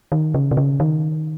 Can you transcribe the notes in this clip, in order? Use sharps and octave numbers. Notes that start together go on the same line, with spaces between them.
D#3
C#3
C3
C#3
D#3